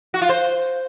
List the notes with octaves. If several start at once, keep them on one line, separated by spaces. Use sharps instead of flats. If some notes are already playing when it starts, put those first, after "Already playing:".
F#4
F4
C5